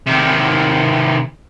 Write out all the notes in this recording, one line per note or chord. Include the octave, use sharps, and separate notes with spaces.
C3 D#3